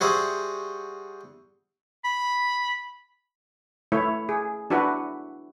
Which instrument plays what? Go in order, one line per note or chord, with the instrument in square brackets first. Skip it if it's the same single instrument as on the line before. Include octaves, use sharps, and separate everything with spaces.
[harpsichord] G3 F#4 G#4 C5 E5 F#5
[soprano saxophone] B5
[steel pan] A3 E4 C#5
G#4
D4 E4 F#4 B4 F#5